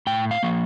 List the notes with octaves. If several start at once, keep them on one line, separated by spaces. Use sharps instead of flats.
A2 G5
F5
F3 A#3